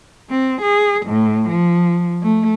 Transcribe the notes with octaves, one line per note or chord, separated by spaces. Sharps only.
C4
G#4
A2
F3
A3